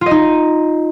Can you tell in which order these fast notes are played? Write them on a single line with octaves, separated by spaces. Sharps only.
F4 D#5 D#4